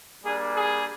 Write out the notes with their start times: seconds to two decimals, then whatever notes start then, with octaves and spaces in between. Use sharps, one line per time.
0.24 G3 A#3 D4 G#4
0.56 G#4